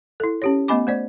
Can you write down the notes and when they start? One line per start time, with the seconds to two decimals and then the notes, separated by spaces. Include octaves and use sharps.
0.20 E4 A4
0.42 C#4 G4 C#5
0.68 A3 B3 D#5 G#5 B5 D6
0.87 A3 C5 D5